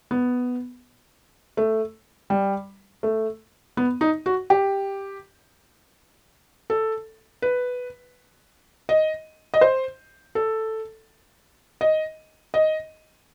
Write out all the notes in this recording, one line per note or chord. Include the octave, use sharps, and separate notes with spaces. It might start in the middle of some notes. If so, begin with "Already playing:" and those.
B3
A3
G3
A3
B3
D#4
F#4
G4
A4
B4
D#5
D#5
C5
A4
D#5
D#5